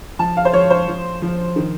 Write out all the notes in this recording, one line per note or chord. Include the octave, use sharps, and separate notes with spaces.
F3 A5
F5
C5
F3 C#5
C5
F3
F3
D#3